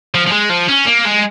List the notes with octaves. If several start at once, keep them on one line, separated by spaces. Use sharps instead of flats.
F3
F3
G#3
F3
C#4
A#3
G#3